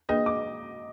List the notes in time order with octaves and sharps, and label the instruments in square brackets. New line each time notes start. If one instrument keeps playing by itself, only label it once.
[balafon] A#3 D4 G#4 B4 [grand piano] D#5
[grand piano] D6